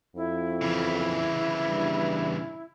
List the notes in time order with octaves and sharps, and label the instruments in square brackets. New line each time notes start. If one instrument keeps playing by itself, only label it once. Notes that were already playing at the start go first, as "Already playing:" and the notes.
[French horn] F2 [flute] E4
[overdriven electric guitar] C#3 E3
[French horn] G2